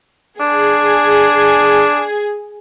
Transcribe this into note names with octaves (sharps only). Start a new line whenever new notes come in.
D4 G#4